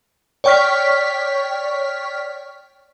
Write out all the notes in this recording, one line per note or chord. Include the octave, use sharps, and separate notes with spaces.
C#5 D5 G5 C#6 F6 B6